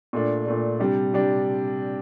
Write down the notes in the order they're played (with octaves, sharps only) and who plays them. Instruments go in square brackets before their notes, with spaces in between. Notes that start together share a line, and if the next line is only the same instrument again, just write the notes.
[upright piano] A#2 A3 D4
A#2 A3 D4
C3 G3 D4
C3 G3 D4